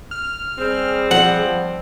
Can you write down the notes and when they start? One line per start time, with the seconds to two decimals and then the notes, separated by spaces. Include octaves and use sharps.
0.11 F6
0.58 G3 C4 G#4
1.11 F3 F#5